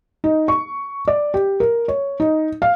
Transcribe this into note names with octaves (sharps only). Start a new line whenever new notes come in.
D#4
C#6
D5
G4
A#4
C#5
D#4
F5